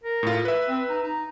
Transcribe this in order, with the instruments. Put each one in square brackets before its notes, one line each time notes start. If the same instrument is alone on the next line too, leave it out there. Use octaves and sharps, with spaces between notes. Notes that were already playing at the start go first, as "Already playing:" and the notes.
[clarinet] A#4
[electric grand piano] A2 F4
B4 E5
[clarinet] C4
D#4
D#4